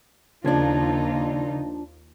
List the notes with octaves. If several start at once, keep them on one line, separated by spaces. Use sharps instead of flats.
D#2 C#3 F3 A#3 D4 D#4 F4 G#6